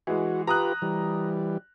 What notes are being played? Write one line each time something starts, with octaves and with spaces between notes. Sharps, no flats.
E3 G#3 F#4
F4 G4 B4 A#5 D#6 F#6
E3 G3